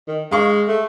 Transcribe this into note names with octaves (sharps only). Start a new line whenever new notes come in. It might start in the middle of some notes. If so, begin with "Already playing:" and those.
D#3
G#3 F5 C#6
A3